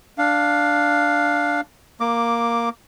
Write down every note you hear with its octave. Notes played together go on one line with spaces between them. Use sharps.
D4 F5
A#3 D6